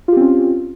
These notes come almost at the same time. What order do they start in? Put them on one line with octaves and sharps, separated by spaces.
F4 G4 C4 C#4